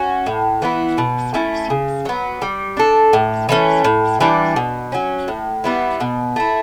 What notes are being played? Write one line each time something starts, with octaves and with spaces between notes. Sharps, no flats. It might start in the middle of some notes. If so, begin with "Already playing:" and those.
Already playing: C#4 F#4
A2
E3 B3 E4
B2
A3 C#4 E4
C#3
F#3 B3
G3
D4 A4
A2
E3 A3 C#4
A2
E3 G3 D4
B2
F#3 C#4
A2
G3 B3 E4
B2
A3 E4